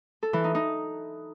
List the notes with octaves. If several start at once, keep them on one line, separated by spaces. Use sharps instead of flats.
A4
E3
D#4
D#4